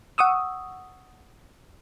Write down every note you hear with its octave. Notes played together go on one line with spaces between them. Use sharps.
F#5 C#6 D#6 E6